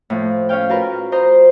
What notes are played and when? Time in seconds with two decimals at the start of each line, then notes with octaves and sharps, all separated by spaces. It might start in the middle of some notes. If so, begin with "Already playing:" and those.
0.10 A2 F3
0.49 C#4 C#5 F5 G5
0.69 F4 F#4 A#4 B4
1.12 C5 D#5 A#5 C6